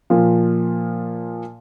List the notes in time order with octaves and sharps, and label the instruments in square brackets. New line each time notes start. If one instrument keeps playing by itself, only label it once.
[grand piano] A#2 F3